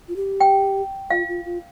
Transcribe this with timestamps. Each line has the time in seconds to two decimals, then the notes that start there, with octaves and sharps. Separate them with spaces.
0.08 F4
0.16 G4
0.40 G5
1.10 F4 F5
1.28 F4
1.45 F4